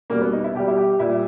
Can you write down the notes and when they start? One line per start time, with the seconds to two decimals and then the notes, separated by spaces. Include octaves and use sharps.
0.10 B2 G3 A#3
0.21 B3
0.33 D#4
0.44 E4
0.54 B2 G3 G4
0.68 E4
0.77 G4
0.99 A#2 G3 E4